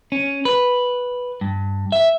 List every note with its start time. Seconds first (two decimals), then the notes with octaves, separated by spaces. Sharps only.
0.12 C#4
0.45 B4
1.41 G2
1.92 E5